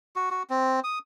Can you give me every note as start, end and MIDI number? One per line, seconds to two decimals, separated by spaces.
0.16 0.30 66
0.31 0.43 66
0.50 0.80 60
0.84 0.99 87